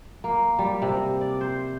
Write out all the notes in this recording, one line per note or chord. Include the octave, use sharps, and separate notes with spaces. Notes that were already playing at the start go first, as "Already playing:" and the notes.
A#3
G3
C3
D5
C5